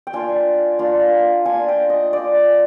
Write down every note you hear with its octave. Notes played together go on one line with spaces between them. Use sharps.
G5
A#3 D4 F4 G#5
A#3 D4 F4
A#3 D4 F4 G#5
G5
D#5
A#3 D4 F4 D5